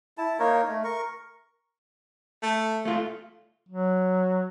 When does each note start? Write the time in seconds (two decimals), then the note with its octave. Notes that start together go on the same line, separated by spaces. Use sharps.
0.18 E4 A5
0.40 A#3 D#4 A#4 C#5
0.68 A3
0.84 A#4 C#6
2.43 A3
2.85 A3 F4
3.69 F#3